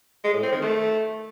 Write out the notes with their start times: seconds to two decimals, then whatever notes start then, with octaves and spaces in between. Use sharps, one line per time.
0.24 G#3
0.33 A2
0.43 C4
0.52 D#3
0.61 A3